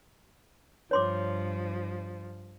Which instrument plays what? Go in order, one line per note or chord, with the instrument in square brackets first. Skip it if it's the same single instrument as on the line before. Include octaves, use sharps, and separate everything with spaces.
[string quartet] G2 F3 [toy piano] C#5 C6 D6